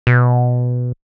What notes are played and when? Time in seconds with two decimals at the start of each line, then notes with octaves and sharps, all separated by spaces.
0.07 B2